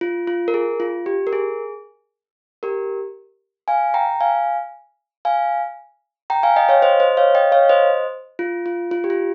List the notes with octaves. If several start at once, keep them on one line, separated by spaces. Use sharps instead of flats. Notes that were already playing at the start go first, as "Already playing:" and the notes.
F4
F4
A#4
G#4
F4
G4
A#4
G#4
G4 A#4
F5 G#5
G5 A#5
F5 G#5
F5 G#5
G5 A#5
F5 G#5
D#5 G5
C#5 F5
C5 D#5
C5 D#5
C#5 F5
D#5 G5
C#5 F5
C5 D#5
F4
F4
F4
G4
F4